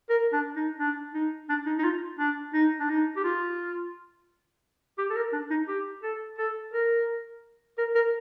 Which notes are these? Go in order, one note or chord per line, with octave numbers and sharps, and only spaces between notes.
A#4
D4
D#4
D4
D#4
D4
D#4
D#4
F4
D4
D#4
D4
D#4
G4
F4
G4
A4
A#4
D4
D#4
G4
A4
A4
A#4
A#4
A#4